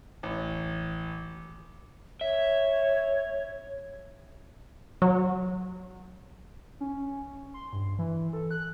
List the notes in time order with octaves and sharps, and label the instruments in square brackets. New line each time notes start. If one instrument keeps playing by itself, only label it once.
[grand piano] A1
[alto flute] C#5 [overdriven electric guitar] E5
[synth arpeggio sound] F#3
[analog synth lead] C#4
C6
G2
E3
A4
F#6